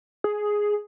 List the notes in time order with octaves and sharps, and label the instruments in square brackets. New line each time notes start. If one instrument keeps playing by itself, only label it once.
[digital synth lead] G#4